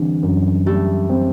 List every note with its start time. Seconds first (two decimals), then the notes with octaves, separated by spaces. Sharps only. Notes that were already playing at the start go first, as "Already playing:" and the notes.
Already playing: D3 E3 G3 C4
0.23 F#2
0.66 G3 A3
1.09 C4